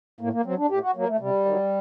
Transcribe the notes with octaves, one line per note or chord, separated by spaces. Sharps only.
A2 A#3
A#3
F#3 C4
D4
A2 G4
F#4
F#3 A#3
A3
C3 G3
D#3 F#3